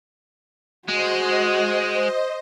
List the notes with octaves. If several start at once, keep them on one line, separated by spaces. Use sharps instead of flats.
G#3 F#4 C5 D#5